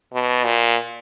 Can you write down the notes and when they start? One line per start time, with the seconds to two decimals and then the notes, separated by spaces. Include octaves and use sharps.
0.13 B2
0.45 A#2